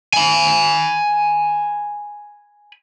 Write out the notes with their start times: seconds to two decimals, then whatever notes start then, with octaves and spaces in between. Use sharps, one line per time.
0.14 G#5 B5